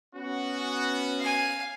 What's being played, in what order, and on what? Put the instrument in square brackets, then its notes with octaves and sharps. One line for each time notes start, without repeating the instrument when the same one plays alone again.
[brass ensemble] B3 C#4 F#4
[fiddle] F5 G#5